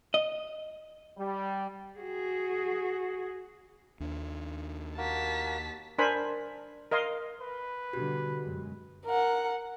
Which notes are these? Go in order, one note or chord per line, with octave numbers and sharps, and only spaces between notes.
D#5
G3
F#4 G#4
D#2 D4
A#3 F#4 A#4 A5 B6
D4 A#4 C5 G#5 B5
A#4 D#5 F5 C6
B4
B2 D3 G3 F#4 G4 F#6
F#2 B2 G#3
A#4 F#5